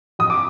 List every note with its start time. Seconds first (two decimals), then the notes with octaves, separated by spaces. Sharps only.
0.19 F2 D#6
0.30 D6